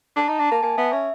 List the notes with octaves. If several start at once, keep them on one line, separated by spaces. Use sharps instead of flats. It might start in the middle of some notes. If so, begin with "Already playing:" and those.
D4 A5
D#4 A#5
D4 A5
A#3 A5
A#3 G#5
B3 E5
C#4 E5